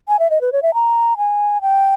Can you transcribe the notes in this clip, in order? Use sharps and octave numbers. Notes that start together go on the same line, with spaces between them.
G#5
E5
D#5
B4
C#5
E5
A#5
G#5
G5